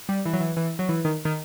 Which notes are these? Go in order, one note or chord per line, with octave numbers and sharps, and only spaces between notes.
G3
E3
F#3
E3
E3
F#3
E3
D#3
D#3